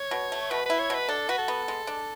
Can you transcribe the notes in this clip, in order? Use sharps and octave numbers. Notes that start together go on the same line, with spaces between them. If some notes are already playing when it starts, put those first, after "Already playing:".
Already playing: C#5
B2
A3
B2 B4
E4 B4
C#5
B2 B4
D4 A4
F#4 B4
A4
B3
G#3
D4